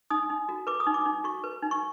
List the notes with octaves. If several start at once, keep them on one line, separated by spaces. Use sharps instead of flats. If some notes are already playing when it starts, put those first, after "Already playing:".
D#4 D#6
D#4
F#4
B4 D6
D#6
D#4
D6
D#4
F#4 C#6
B4
D#4
C#6